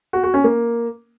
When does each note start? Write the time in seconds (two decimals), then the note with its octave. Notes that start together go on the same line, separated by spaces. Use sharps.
0.13 F#4
0.24 F#4
0.34 C#4
0.44 A#3